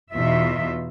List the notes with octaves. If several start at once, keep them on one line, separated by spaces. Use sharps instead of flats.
E2 B2 D#4 F4 E5